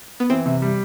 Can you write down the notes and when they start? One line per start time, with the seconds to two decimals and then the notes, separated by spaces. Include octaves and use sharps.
0.20 B3
0.30 E3 C4
0.46 C3
0.62 G3